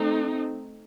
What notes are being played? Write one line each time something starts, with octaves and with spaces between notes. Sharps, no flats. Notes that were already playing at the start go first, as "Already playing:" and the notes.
Already playing: A3 C4 D#4